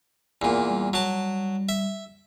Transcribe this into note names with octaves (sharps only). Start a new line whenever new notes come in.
E2 A#2
G3
F#3 A5
E5